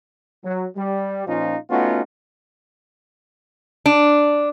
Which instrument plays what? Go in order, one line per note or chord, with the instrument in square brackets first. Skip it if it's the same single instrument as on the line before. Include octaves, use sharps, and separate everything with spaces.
[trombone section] F#3
G3
A#2 F3 C#4 D#4 F4
A3 B3 C#4 D#4 F4 F#4
[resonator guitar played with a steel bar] D4